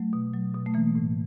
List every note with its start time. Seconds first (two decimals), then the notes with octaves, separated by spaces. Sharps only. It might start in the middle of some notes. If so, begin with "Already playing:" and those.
Already playing: F#3 A3
0.13 B2
0.33 F#3
0.54 B2
0.66 A3
0.74 E3 A#3
0.95 A2